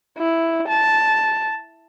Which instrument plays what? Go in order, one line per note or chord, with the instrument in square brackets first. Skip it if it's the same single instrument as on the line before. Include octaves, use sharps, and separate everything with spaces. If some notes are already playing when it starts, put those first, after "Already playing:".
[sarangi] E4
A5